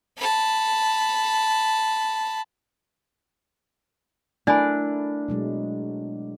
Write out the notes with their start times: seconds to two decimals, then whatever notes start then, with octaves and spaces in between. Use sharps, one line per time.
0.17 A5 B5
4.47 A3 D4 E4 A#4 D5 G#5 B5
5.28 B2 F#3 G#3